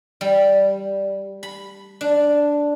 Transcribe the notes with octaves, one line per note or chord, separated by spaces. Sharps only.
G3
B5
D4